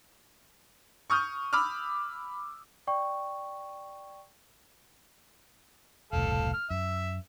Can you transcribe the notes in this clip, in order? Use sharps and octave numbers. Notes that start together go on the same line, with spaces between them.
C#6 D#6 F6 G6
B5 D6 E6 F6
D5 G5 C#6
E1 C2 A2 A4 F5
F6
F#2 E5